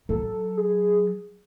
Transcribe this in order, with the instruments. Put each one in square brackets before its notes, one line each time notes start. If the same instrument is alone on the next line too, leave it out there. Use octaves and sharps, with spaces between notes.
[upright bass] F#3 [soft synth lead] A4
[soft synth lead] G#4